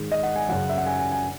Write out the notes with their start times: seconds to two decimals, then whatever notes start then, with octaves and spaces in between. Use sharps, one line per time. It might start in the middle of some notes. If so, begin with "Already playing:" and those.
Already playing: G#2 D#3 G#3
0.12 D#5
0.23 F#5
0.36 G#5
0.49 F#2 C#3 F#3 F#5
0.69 E5
0.78 F#5
0.86 G#5
0.99 G#5
1.12 G#5